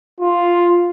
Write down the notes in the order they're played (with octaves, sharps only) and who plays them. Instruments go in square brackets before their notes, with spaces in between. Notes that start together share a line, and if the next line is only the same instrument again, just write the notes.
[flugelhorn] F4